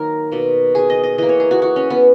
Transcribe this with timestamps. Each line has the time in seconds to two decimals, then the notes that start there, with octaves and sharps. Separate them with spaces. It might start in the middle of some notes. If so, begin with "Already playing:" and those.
Already playing: D#3 F#3 A#3 A#4
0.31 B2 A#3
0.75 G#4
0.90 D#5
1.03 D#5
1.18 E3 A#3 D#5
1.29 C#5
1.40 G#4
1.51 F#4
1.62 F#4
1.76 C#4
1.90 B3